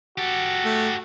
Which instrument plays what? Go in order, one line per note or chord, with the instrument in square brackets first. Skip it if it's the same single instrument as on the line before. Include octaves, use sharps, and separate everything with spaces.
[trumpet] F#4 [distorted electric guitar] G4 A4
[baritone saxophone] A3